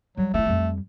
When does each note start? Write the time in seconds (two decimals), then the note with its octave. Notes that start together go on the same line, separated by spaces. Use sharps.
0.17 F#3 G3
0.34 A3 D#4 E4
0.45 F2 G3